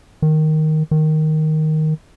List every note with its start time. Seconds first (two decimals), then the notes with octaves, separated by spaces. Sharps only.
0.22 D#3
0.91 D#3